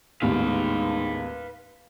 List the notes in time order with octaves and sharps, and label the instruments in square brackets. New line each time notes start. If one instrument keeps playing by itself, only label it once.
[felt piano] A1 D#2 B3 [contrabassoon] G#2 [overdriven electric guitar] B4 F5